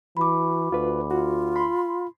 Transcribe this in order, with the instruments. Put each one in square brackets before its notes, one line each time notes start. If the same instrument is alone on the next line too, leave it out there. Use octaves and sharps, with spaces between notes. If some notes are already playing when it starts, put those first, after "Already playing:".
[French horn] E3 [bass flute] F#4 [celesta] B5 D6
[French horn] D2 [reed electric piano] F4 B4
[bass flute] F4 [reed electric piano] F#4
[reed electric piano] B5 C6